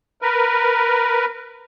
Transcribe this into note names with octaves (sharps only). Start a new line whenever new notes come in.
A#4 B4